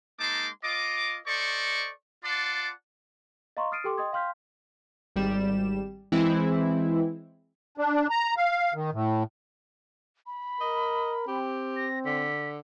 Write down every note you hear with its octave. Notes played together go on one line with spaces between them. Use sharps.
G#3 A#3 D#4 A5 C6 D6
F4 D#5 D6
A4 C5 D5 D#5 C#6
F4 D5 F#5 A5 C6 D6
D#5 F5 A#5 C6 C#6
D#6 F6 A6 C7 D7 D#7
G4 A4 G5 C6 D6
D#5 G5 C6 D#6 G#6
F5 G5 C6 F6 G6 B6
G#1 G3 E7
E3 G#3 C4 E4
D4
A#5
F5
D#3
A2
B5
A#4 D#5
C4 G4
A#6
D3 B6